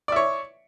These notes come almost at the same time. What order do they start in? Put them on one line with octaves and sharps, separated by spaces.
D5 E5 C#5